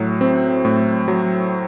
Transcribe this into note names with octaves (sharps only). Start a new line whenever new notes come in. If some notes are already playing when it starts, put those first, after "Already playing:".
Already playing: A2 F#3
C4
A2
F#3